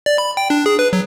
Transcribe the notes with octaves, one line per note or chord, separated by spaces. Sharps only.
D5
B5
G5
D4
G#4
B4
F#3